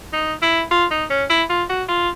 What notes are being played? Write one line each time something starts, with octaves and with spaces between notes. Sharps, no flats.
D#4
E4
F4
D#4
C#4
E4
F4
F#4
F4